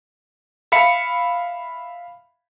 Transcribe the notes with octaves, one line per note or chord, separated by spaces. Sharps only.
E5 F5 B5 C#7